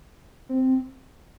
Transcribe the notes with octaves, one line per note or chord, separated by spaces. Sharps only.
C4